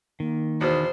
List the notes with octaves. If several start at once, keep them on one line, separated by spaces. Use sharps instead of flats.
D#3 A#3
E2 B2 C5